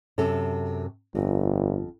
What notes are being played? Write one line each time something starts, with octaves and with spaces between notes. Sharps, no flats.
F#2 C3 A4
G1 F2